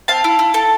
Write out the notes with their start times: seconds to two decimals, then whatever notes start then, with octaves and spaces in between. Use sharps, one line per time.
0.08 C4 F5 A5
0.24 E4
0.39 E4
0.54 A4